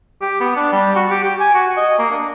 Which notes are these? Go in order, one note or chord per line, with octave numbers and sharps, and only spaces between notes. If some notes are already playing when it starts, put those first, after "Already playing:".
G4
B3
D4
G3
F#4
G4
G4
G#5
F#4
D#5
A#3
D4